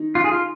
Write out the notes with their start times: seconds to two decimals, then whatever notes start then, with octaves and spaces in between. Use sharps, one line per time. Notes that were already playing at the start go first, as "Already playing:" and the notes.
Already playing: D#3 D#4
0.15 F4
0.24 G#4
0.32 F4